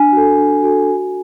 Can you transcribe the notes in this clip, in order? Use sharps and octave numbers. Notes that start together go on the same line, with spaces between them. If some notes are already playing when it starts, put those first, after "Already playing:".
Already playing: D4 G#5
F#4 A4
D4
F#4 A4
F#4